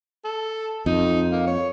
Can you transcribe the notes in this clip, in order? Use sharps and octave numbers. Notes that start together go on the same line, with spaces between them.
A4
F2 D#4
A#3
C#5